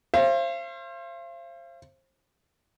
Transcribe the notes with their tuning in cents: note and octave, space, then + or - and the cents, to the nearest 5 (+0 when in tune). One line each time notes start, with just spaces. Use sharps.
C5 +30 F5 -40